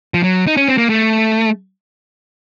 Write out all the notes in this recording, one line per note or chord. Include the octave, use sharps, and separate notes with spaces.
F3
F#3
D#4
C#4
C4
A#3
A3